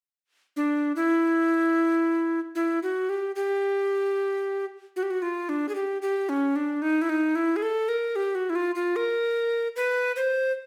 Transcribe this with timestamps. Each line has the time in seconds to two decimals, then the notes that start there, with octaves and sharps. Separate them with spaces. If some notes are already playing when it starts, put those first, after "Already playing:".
0.56 D4
0.96 E4
2.55 E4
2.83 F#4
3.09 G4
3.36 G4
4.96 F#4
5.03 G4
5.10 F#4
5.22 F4
5.49 D4
5.69 G#4
5.75 G4
6.02 G4
6.29 C#4
6.56 D4
6.82 D#4
7.02 E4
7.09 D#4
7.35 E4
7.56 G#4
7.62 A4
7.89 A#4
8.16 G4
8.35 F#4
8.50 E4
8.55 F4
8.75 F4
8.96 A#4
9.76 B4
10.16 C5